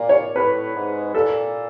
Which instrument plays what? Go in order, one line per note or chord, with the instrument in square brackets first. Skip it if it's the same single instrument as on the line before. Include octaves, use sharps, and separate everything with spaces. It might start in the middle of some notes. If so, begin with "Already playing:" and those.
Already playing: [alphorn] A#2 [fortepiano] D5
[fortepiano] C#5
[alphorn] A2 [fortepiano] B4
[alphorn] G#2
[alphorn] A#2 [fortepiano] A4